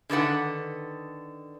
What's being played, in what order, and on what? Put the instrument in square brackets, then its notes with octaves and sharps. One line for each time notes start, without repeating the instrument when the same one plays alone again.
[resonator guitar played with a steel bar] D3 D#3 B4 F#5